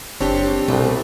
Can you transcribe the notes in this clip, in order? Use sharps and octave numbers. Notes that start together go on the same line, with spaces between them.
F#1 C4 D4 G4 C#5
C2 B2 A3